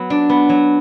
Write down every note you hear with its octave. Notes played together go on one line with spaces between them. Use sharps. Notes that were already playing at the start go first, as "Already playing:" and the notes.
Already playing: F#3 B3
D4
B3
F#3